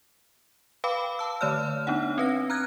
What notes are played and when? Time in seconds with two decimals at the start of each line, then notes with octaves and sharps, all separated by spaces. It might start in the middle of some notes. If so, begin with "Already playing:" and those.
0.84 B4 F5 G5 B5 D6
1.19 A5 E6
1.41 D3 A3 C#5 D5 F6
1.87 B3 D4 D#4 F#5
2.18 C4 B4 A#6
2.50 A#5 F6 F#6 G#6